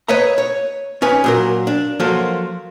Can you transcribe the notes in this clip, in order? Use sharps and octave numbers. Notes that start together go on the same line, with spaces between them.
B4 C#5 D#5 E5 A#5
C#5
C#4 D#4 B4 G#5
A#2 F#3 A#4
D4
F3 F#3 A#3 F4 F#4 A4